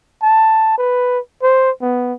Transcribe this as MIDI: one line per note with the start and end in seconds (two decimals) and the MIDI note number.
0.22 0.75 81
0.78 1.19 71
1.42 1.70 72
1.81 2.13 59